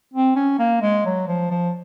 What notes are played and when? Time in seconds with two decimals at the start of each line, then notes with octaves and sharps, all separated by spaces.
0.13 C4
0.36 C#4
0.59 A#3
0.82 G#3
1.05 F#3
1.28 F3
1.50 F3